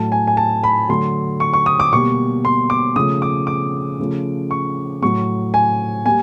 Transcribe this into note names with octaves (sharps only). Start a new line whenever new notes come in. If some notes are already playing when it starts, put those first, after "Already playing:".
Already playing: A2 F#3 A3 A5
G#5
G#5
A5
B5
D3 F#3 A3 C6
C#6
C#6
D#6
D6
B2 G3 A#3 C#6
C6
D6
C#3 F3 A3 D#6
D6
D6
C#3 F3 A3
C#6
A2 F#3 A3 C#6
G#5
G3 A#3 G#5